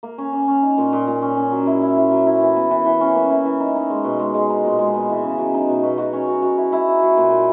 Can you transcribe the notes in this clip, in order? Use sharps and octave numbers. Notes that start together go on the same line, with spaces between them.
A#3
C#4
C#4
C#4
D#4
A#2
A#2
A#2
C#4
C#4
F#3
E4
E4
E4
F#3
E4
E3
B3
E3
E3
C#4
A#3
E4
E3
D#4
D#4
G#3
B2
G#3
G#3
D#4
A#2
G#3
B3
E3
C#3
F#3
D#4
B2
B2
F#4
C#4
F#4
F#4
E4
E4
F#3
F#3
A#2
A#2